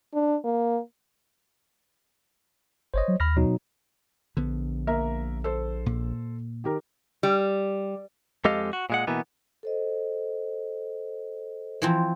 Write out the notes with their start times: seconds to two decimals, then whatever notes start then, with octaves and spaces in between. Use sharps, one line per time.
0.14 D4
0.44 A#3
2.94 G1 C5 C#5 D#5
3.08 F#3
3.20 D#2 B5 F6 A#6
3.37 B2 F#3 D#4
4.37 A#1 D3 B3
4.87 A#3 A#4 E5
5.44 A4 C5
5.86 A#2
6.64 D#3 G4 A#4
7.23 G3
8.45 F2 G#3 G4 A4 D#5 F5
8.73 F#4
8.90 A#2 G#3 F#5
9.07 B2 E3 A#3 B3
9.63 A4 C5 D#5
11.82 E3 F3 C4